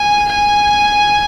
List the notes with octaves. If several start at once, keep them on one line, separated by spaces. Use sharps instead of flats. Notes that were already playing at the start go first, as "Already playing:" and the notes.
Already playing: G#5
G#5